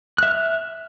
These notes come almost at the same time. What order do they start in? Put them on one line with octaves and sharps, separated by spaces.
F#6 E5 F6